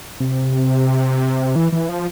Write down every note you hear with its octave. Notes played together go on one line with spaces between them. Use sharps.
C3
E3
E3
F3